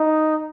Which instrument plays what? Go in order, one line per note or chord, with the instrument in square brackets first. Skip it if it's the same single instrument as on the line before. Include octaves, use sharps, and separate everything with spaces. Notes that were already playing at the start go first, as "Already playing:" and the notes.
Already playing: [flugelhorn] D#4